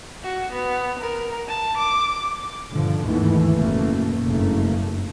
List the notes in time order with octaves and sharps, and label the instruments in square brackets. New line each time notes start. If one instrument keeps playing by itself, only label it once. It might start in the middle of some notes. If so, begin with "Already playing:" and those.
[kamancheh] F#4
B3
A#4
A5
D6
[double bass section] G2 A#2 D3 D#3 F3
D#2 G#2 D#3 E3 A3 B3
F#1 B2 A3 A#3
F#1 G2 A3 A#3